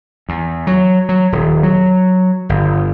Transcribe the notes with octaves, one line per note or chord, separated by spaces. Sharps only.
E2
F#3
F#3
D#1
F#3
G1